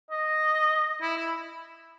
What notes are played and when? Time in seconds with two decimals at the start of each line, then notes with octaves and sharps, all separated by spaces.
0.11 D#5
1.01 E4
1.17 E4